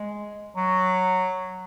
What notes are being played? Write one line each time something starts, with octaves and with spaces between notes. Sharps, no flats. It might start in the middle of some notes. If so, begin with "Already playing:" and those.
Already playing: G#3
F#3